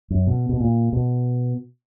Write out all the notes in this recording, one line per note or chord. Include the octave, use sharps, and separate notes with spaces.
F#2
B2
B2
A#2
B2